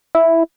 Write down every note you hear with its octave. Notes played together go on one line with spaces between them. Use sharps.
E4